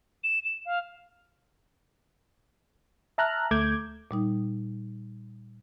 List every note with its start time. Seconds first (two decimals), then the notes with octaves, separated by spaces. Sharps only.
0.23 E7
0.44 E7
0.65 F5
3.18 E5 A5 A#5 F6 F#6
3.51 D2 A3 D6 G6 G#6
4.11 A#2 G3 D#4